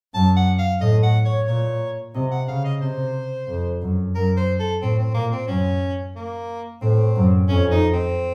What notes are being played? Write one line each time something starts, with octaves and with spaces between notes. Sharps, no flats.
F#2 A5
F#5
F5
A2 D#5
F#5
C#5
A#2 C#5
C3 D#5
F#5
C#3 F5
D#5
C3 C5
F2
F#2
F#2 A#4
C5
A4
A2 C4
C4
A#2 A#3
C4
F#2 C#4
A#3
A2 C4
F#2
F2 C#4
D#4
C4